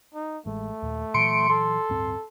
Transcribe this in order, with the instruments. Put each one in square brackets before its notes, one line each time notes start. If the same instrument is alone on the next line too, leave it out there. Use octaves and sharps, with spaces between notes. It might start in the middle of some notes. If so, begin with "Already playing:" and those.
[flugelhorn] D#4
[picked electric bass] A1 G#3 [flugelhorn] A3
[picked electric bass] D#2 A#2
[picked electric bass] A#2 E3 F#3 [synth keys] C6 C#7 D7
[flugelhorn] A4 [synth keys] C6
[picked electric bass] D1 G2 C4